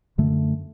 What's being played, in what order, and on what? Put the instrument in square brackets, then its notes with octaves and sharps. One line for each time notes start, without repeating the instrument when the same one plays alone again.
[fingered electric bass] F#2 D3 A3